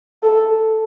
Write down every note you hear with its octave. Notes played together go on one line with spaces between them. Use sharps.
A4